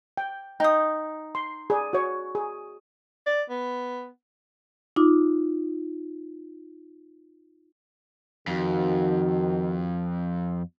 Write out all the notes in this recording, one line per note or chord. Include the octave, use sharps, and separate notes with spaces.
G5
D#4 G5 D#6
C6
G#4 D5
F#4 C#5
G#4
D5
B3
D#4 F4 D6
F2 D#3 F#4